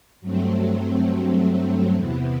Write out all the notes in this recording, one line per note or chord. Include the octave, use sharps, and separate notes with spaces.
G2 F#3 A3 C4
E2 C3 E3 B3